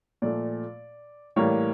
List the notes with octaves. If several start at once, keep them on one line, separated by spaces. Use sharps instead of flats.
A#2 F3 A3 D5
A2 E3 G3 A#3 C#5